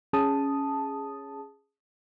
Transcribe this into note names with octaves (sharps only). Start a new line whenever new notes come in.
C#4 G#4 A5 D#6